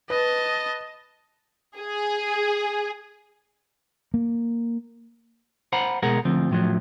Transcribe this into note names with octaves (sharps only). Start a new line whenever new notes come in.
B4 D#5 A5
G#4
A#3
C5 F#5 A#5 B5
B2 G#3 G#4 A#4 F#5 A#5
D2 F3 C4
A2 F3 F#3